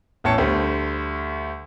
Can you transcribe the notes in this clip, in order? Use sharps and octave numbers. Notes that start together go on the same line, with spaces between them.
A1 E2 A2 C#5 A5 C#7
D2 G3 A3 G4 C5